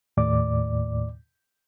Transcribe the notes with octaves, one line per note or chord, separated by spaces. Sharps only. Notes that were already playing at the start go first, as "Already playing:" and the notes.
D#2 A2 D5 D6